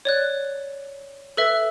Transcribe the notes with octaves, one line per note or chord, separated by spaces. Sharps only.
C#5 D5 F#6
A4 B4 E5